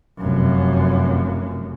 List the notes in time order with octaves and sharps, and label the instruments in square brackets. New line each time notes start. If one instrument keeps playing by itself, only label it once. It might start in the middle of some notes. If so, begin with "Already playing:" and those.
[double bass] F1 F#2